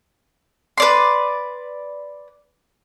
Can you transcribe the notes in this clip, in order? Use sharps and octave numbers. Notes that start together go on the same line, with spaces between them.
B4 D5 C6